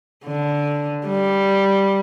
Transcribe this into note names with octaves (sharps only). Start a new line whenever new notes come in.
D3
G3